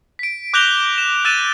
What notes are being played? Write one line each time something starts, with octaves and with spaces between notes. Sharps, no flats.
B6 D7
D6 F#6 G6 A#6 F7 G7
E7
E6 F#6 A6 D#7 E7